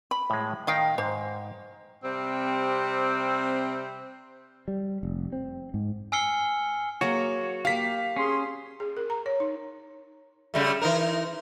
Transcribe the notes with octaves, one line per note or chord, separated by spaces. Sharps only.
B5
A2 G#3
D#3 D#5 F5 G5
G#2 C5
C3 G3 C4
G3
F1
C4
G#2
G#5 E6 F6 C7 C#7 G7
F#3 A#3 F#4 G#4 C#5
A#3 G4 F5 B6
C#4 G#4 C6
G#4
A#4
A#5
C#5
D#4
C#3 G3 A3
E3 D#4 A#4